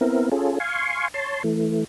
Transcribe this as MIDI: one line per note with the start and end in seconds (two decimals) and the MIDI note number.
0.01 0.29 59
0.01 0.29 60
0.01 0.29 64
0.01 0.29 70
0.32 0.59 61
0.32 0.59 65
0.32 0.59 68
0.32 0.59 69
0.60 1.08 77
0.60 1.08 80
0.60 1.08 84
0.60 1.08 85
1.14 1.43 73
1.14 1.43 81
1.14 1.43 84
1.44 1.85 52
1.44 1.85 57